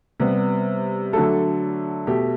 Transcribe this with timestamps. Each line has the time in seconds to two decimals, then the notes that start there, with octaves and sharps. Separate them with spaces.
0.20 C3 G3 B3
1.13 D3 F#3 A3 A4
2.07 B2 A3 G4